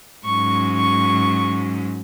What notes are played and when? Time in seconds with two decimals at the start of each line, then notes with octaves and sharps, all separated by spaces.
0.25 G#2 F#3 C#4 C#6
0.75 C#6